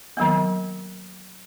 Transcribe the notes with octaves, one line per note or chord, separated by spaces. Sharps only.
D#3 F#3 A#3 B3